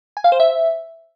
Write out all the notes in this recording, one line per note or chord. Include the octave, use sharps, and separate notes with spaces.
G#5
F5
C5
E5